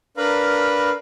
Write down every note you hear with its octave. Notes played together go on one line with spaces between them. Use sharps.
D4 A#4 B4 F5 A#5 B5